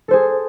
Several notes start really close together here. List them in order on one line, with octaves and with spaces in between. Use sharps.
A4 C5 G#4